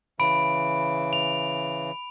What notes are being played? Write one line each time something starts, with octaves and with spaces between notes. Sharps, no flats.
C#3 E3 B5 D7
F7